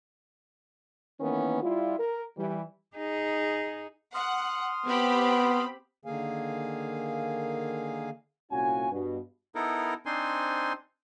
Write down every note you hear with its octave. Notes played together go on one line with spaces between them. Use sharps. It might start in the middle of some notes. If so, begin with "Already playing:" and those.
D#3 E3 A#3 B3 C#4
G3 E4 F4
A#4
E3 G3
D#4 G#4
F#5 C6 D#6 F6
B3 C4 G4 B5
D3 D#3 A#3 G#4 F5 G#5
C2 A#2 C#4 F4 F#4 G#5
G2 B2
B3 D#4 E4 A4 A#4
C4 D4 D#4 C5 G#5 C6